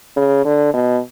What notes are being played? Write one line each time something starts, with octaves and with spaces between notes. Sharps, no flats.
C#3
D3
B2